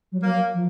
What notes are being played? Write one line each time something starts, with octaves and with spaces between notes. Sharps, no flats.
F#3
F#3 A#3
F3